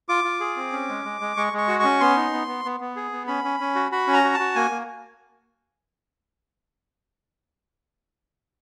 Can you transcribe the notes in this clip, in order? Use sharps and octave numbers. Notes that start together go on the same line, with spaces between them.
F4 D6
F4
G#4
C4
C#4
G#3
G#3
G#3
G#3 C#6
G#3 C#6
F#4
C#4 C#6
B3 C6
D#4
B3
B3
B3
B3
G#4
B3
C#4 B5
C#4
C#4
F#4
F#4 B5
C#4
A#5
F#4
A5
F#4
A#3 G#5
A#3